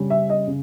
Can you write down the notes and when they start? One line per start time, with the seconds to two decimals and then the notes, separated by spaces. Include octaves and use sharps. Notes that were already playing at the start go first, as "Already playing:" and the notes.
Already playing: C#3 G3 C#4
0.10 E5
0.30 D#5
0.47 C#3